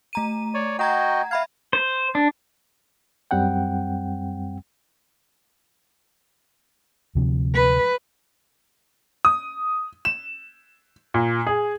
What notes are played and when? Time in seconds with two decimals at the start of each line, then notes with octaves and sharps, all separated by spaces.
0.13 A3 A#5 D#7
0.54 C#5 D5
0.79 F#4 D#5 F#5 G5 A#5 G#6
1.31 E5 F5 B5 G#6
1.73 C5
2.15 D4
3.31 F#2 G3 C4 F#5 G5
7.15 D2 C3 F3
7.55 B4
9.25 D#6
10.05 E7
11.14 A#2
11.47 G#4